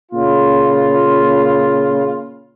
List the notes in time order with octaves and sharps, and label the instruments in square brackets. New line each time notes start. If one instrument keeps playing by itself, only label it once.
[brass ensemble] A#2 C#3 F4